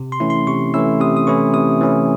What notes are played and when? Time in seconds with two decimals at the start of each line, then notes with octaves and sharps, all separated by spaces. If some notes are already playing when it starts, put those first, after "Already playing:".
Already playing: C3
0.12 C6
0.20 E3 A3 C#4 E4
0.30 C6
0.47 C3 C#6
0.74 E3 A3 C#4 E4 E6
1.00 C3 D#6
1.17 D#6
1.27 E3 A3 C#4 E4 C#6
1.54 C3 D#6
1.81 E3 A3 C#4 E4